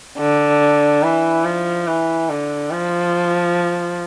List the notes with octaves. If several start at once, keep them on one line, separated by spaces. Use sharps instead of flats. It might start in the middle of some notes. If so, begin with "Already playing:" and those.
D3
E3
F3
E3
D3
F3